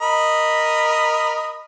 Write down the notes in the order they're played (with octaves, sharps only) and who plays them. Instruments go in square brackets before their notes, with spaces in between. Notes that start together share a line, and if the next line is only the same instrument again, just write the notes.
[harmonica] A#4 D#5 B5